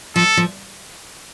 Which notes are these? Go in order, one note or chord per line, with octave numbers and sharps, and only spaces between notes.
F3 A4
F3